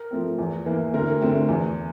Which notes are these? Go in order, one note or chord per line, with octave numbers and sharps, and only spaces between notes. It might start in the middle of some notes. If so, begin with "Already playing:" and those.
Already playing: A#4
F3 A3 C4
E2
E3 A#3
D2 A#4
D3 A3 C4
E2